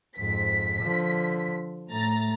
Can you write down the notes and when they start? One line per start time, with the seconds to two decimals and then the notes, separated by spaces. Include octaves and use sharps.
0.18 F2 G#2 B6
0.82 D3 F3
1.90 A2 A3 A#5 A6